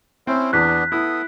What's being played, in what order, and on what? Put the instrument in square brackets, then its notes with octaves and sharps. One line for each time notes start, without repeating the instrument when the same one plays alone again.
[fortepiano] C4 [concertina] C#4 E4 C5
[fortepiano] E2 [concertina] B3 D4 [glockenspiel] F#6 B6
[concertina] B3 A4 D#6 [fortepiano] E4